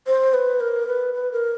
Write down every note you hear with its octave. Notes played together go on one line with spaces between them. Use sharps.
C5
B4
A#4
B4
B4
A#4